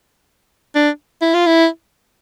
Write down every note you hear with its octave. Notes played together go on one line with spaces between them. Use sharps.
D4
E4
F4
E4